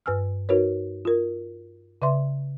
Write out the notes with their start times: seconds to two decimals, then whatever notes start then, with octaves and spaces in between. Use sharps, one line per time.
0.06 G2 B4 G#5 E6 F6
0.49 D#4 F#4 A#4 B4 C#5
1.05 F4 A#4
2.02 C#3 B4 D5 E5 C6